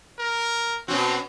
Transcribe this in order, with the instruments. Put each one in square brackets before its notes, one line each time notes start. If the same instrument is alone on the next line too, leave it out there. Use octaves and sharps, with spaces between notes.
[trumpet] A#4
[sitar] B2 C#4 F#4 [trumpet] C4